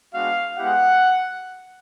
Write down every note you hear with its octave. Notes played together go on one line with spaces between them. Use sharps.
G#3 B3 D4 F#4 F5
G#3 B3 E4 G4 F#5